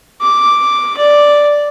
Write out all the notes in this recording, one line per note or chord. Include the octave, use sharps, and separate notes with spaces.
D6
D5